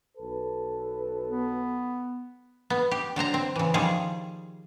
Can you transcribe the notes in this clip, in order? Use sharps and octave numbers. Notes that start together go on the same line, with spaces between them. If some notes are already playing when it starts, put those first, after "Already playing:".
B1 A4 B4
B3
B3
G4
D3 F#3 C5 A#5
C4
C#3 E3
D#3 F3 G3 G#4